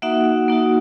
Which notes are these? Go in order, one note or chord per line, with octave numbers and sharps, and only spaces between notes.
A#3 D#4 F#4 E5 F#5
A#3 D#4 F#4